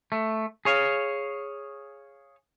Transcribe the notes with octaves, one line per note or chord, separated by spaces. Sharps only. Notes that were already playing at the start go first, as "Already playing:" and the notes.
A3
G#4 C#5 F5